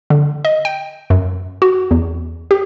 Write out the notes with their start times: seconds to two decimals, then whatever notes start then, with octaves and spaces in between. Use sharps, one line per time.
0.10 D3
0.45 D#5
0.65 G5
1.10 F#2
1.62 F#4
1.91 E2
2.51 G4